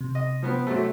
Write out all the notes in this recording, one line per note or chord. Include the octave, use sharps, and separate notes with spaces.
C3
D#5
F3 B3 C4
C3 F#3 A3